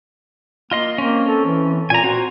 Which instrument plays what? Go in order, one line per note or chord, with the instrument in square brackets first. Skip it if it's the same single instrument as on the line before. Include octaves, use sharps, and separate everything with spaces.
[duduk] A#3 [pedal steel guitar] F4 D#5 C6
[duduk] A#3 [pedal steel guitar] C4 C#4
[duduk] A4
E3
[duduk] A#2 [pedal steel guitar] G#5 A#5
[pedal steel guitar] C4 C5 [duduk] F#4